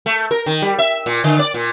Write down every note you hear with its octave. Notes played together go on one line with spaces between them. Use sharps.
A3
A#4
D#3
G3
E5
A#2
D3
D5
A#2